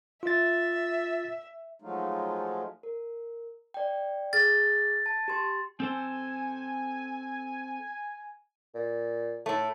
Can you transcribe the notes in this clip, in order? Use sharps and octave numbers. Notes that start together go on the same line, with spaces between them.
F4 E5 A6
F3 F#3 G#3 A3 D#4 F4
A#4
D5 G5
G#4 A4 F6 A6
A5
G4 C6
C4 A4 C5 G#5
A#2
A2 A3 E4